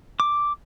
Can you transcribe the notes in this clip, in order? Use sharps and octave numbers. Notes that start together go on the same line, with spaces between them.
D6